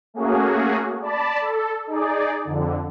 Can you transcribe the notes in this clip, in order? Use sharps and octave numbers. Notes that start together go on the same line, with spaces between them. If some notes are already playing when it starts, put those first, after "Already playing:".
A3 A#3 C#4 F#4 G#4
D5 A5 B5
A4
D#4 G#4 D5
F2 D3